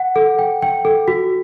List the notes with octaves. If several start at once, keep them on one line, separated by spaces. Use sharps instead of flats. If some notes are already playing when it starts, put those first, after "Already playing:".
Already playing: F#5
A4
G5
G5
A4
F#4